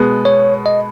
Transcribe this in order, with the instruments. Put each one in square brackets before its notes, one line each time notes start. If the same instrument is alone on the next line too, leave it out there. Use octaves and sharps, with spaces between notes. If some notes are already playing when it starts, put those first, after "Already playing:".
Already playing: [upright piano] B2 G#3 B3
[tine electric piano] C#5
D#5